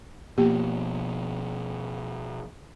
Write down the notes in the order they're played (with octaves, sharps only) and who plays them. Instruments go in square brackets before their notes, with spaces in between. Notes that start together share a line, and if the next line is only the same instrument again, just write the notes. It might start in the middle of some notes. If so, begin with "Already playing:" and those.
[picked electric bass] B2 F3 [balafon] A#3 G4